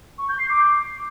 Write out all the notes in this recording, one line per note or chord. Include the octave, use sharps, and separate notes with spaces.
C#6
G6
C7
D6